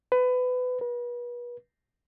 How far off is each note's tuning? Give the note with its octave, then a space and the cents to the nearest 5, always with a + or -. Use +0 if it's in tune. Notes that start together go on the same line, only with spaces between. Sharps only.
B4 +25
B4 -35